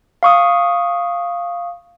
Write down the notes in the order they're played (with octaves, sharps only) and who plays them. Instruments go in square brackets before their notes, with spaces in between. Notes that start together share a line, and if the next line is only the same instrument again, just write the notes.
[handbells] F5 C#6 D#6